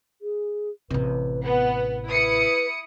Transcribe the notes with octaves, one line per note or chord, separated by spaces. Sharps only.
G#4
A1 C3 B4
B3 B4
E4 B4 D#6 C#7